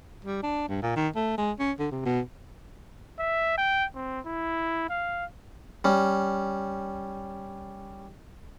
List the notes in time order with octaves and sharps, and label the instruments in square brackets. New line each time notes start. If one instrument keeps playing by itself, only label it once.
[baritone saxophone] G3
D4
G2
A#2
D#3
A3
G#3
C#4
D3
C3
B2
[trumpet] E5
G5
C4
E4
F5
[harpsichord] G3 C#4